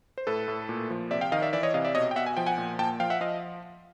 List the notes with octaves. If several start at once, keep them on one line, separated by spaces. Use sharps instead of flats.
C5
A2 A4 B4
A2
A#2
F3
C3 D5 E5
F5 G5
D#3 D#5 F5
D5 E5
E3 D5 E5
C#5 D#5
C3 D#5 F5
D5 E5
B2 C#5 D#5
G5
B2 E5 F#5
G#5
F3 G5
F#5 G#5
A#2
A#2 G5 A5
F3 F5 G5
E5 F#5
F3 D#5 F5